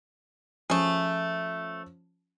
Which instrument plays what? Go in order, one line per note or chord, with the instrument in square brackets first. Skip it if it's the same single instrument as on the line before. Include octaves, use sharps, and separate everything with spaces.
[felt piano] F3 C#4 [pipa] A3 G#4